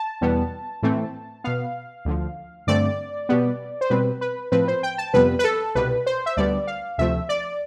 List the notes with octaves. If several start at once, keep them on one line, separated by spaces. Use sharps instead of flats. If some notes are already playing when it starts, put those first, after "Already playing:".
Already playing: A5
E2 B2 G3 B3
A2 E3 A3 C4
B2 B3 F5
D2 D3 F3
G2 D3 A3 C4 D5
B2 G3 B3
C5
B2 G3 C4 B4
B4
A2 F3 C4 B4
C5
G5
A5
F2 C3 G3 B3 B4
B4
A4
C2 B2 G3 B4
C5
E5
D2 D3 G3 B3 D5
F5
D2 C3 F3 A3 E5
D5